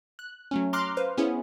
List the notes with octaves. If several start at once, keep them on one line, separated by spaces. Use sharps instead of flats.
F#6
F#3 A3 C#4
A#5 C6 D6 F6 F#6 C7
B4 C5 F5
B3 C#4 E4 G#4